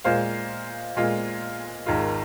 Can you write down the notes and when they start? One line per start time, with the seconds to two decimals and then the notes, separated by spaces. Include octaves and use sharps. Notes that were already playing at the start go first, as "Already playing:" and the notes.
0.04 A#2 G#3 F4 C5 F5
0.97 A#2 G#3 F4
1.86 G#1 G#2 D#3 G#3 F4